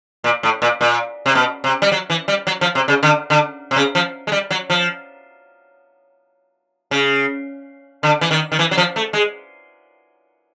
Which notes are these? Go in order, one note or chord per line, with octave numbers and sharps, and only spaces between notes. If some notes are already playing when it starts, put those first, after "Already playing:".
A#2
A2
A#2
A#2
C3
B2
C3
G3
F#3
E3
G3
F#3
F3
C3
C#3
D3
D3
C3
C#3
F3
G#3
G3
F#3
F3
C#3
D3
E3
D#3
D#3
E3
F#3
F3
A3
G#3